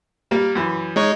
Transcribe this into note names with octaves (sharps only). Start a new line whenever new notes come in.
G3 A#3
F#2 E3
G#3 D#4 C#5